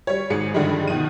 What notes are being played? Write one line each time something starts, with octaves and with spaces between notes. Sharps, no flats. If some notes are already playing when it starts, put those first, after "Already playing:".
G3 C#5
G#1 G#2 G#4 C#7
G2 D3 D#3 F3 G3 G#3
B2 D#3 F3 D#7